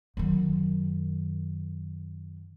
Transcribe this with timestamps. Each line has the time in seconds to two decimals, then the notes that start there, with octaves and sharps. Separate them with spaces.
0.17 F#2 D#3